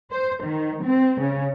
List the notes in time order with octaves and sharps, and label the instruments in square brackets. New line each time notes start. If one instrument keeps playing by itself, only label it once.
[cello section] C5
D#3
C4
C#3